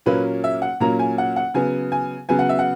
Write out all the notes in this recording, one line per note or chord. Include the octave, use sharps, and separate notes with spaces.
A#2 F#3 A#3 C#4 B4
E5
F#5
A#2 F#3 A#3 C#4 A#5
G#5
F#5
F#5
C#3 F#3 B3 G#5
G#5
C#3 F#3 B3 G#5
F#5
E5
F#5